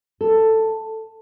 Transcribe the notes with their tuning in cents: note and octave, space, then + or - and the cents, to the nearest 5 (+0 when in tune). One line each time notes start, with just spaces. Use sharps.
A4 +10